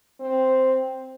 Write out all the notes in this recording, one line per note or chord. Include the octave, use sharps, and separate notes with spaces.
C4